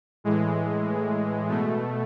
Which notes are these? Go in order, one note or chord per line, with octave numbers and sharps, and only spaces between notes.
A2 E3 G#3
B2 A3